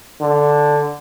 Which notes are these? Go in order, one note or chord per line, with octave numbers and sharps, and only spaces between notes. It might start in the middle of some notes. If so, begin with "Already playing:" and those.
D3